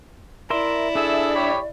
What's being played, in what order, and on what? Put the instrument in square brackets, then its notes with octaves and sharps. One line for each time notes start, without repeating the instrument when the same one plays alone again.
[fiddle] E4 [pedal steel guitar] A#4 E5 C6 [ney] D5
[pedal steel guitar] D4 E5 [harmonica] G#4 A4
[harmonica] G4 C#5 B5